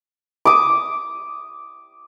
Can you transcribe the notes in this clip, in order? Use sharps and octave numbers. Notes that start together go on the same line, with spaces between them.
D6 D#6